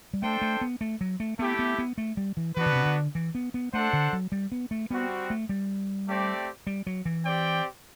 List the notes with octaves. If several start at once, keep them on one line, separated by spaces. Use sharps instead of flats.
G3
A3 D4 A4 C5 G5
A3
B3
A3
F#3
A3
A3 B3 E4 G4
B3
B3
A3
G3
E3
E3 B3 D4 F#4 B4
D3
C3
D3
E3
B3
B3
A3 D4 A4 C5 F#5
D3
F#3
G3
B3
A3
G3 B3 C4 F#4
A3
G3
A3 C4 G4 D5
G3
F#3
E3
C4 G4 D5 G5